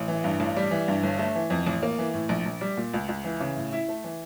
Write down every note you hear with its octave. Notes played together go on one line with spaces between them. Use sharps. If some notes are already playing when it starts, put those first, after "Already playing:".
Already playing: A1
E3
G2
A1
G3
E3
G2
G1
A3
E3
F2
A1
A#3
E3
A2
A#1
A#1
G3
A#2
C#2
C#2
E3
C#3
A2
E4
A3
E3